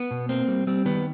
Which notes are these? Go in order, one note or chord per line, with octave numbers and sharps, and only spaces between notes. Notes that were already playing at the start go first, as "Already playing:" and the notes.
Already playing: B3
B2
A#3 C4
G3
G3 C4
D#3 B3